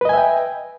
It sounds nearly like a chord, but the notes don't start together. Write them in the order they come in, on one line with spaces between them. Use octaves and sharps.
B4 D#5 G#5 E5 G5